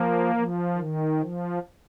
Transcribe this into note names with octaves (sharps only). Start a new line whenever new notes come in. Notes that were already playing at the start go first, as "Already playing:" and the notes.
Already playing: F3 A#3
F3
D#3
F3